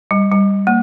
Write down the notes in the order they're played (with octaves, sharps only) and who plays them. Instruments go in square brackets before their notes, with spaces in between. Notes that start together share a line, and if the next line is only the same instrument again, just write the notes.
[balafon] G3
G3
A#3